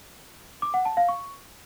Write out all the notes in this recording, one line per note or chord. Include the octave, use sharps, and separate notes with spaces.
D6
F#5
A5
F5
C#6